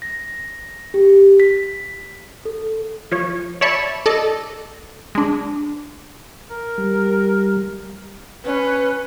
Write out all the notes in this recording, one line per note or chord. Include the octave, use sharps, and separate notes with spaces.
A#6
G4
B6
A4
F3 C#5
C#5 D5 E5 A5 B5 C#6
A4 D5 D#5 A5
G#3 D4
A#4
G3
C#4 B4